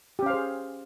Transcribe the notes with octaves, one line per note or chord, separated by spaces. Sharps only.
C#4 G4 G#4 C5 F5